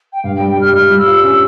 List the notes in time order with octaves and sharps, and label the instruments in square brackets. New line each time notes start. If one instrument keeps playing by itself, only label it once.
[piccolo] G5
[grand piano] G2 [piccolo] F5
[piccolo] G5
[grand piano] G3
[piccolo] G5
[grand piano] G3 [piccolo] F6
[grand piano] G3 [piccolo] F6
[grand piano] G3
[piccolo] E6
[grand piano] F4
[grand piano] C#4 [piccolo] E6